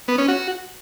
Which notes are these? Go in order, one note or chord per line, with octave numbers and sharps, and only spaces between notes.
B3
C#4
F#4